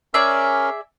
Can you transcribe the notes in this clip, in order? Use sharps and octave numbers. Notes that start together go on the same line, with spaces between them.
C#4 G#4 A#4 D5 E5